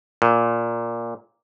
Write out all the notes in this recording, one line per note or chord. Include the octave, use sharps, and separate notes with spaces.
A#2